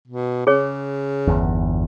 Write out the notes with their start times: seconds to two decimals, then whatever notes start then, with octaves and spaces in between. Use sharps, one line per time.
0.08 B2
0.47 C#3 G#4 C#5
1.27 G1 E2